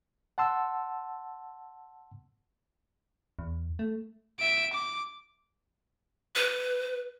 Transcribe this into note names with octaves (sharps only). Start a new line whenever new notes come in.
F#5 A5 C6 E6
E2
A3
E5 D7
D6
B4